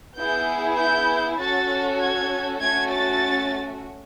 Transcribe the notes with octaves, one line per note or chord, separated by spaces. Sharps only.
B3 E4 G#4 G6
G6
C#4 F#4 A4 A6
G#6
A3 C#4 F#4 G#6
A6